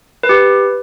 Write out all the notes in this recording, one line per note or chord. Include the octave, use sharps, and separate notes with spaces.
B4
G4
B4